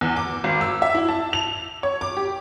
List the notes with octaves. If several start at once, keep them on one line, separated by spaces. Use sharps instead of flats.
E2
D6
G#1
E6
E5
E4
A5
F7
C#5
D6
G4